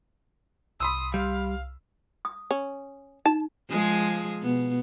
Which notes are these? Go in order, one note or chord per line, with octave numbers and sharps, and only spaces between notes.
C2 B5 C6 D#6 E6
G3 F5
D#6
C#4
D#4 A5
F3 G#3 G#4
B2 B3